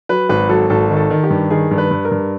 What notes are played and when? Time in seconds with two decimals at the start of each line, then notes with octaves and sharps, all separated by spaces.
0.09 F#3 B4
0.29 G#1 B4
0.49 F#3 A4
0.70 G#1 A4
0.91 D#3
0.97 A4
1.10 D#3
1.24 G4
1.30 G2
1.50 D#3 G#4
1.71 G2
1.78 B4
1.91 G2
2.05 A#4
2.11 G2